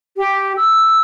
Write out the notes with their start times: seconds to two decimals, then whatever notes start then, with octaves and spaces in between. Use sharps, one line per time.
0.17 G4
0.57 E6